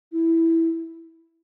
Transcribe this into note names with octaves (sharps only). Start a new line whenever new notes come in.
E4